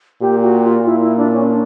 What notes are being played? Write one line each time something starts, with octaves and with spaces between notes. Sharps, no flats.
A#2 G4
F#4
F4
A#2 E4
E4
D4
C#4
D4